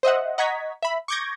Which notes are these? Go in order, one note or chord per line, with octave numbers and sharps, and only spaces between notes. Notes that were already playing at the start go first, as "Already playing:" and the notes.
C5 D#5 E5 F#5
D#5 F#5 A#5 C#6 G#6 B6
E5 B5
C#6 D6 G6 G#6 A#6